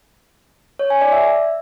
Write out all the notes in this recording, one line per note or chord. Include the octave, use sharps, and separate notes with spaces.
C#5
G#5
D5
E5